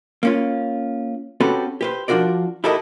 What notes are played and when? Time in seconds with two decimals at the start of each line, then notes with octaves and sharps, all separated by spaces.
0.23 A#3 C#4 F4
1.40 C4 C#4 F#4 G4 A4 B4
1.81 G4 B4 C5
2.08 F3 D4 F4 F#4 A#4 D5
2.64 E4 G4 A4 A#4 D#5